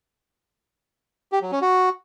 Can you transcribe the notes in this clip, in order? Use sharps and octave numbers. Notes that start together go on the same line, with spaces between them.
G4
F#3
C#4
F#4